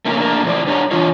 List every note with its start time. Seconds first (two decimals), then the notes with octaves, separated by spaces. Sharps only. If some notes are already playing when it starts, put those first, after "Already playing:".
0.05 A3 A#3 C#4 A#4
0.17 A3 A#3 D4 A#4
0.44 F2 A2 E3 C5 D5
0.66 G3 D4 C#5 D#5 F#5 A#5
0.91 E3 D4 F4 C#5